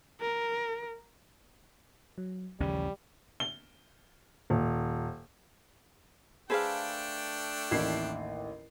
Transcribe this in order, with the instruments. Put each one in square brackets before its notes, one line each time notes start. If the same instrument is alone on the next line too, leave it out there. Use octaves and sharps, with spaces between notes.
[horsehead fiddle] A#4
[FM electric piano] F#3
[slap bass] A1 D#2 C#4 [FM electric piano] C#3 F3 [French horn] G3
[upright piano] G7
D#1
[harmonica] A3 D4 G5 [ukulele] G#4 B4 C5 [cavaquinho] A4 F5
[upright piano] A1 D#2 C7 [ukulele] E4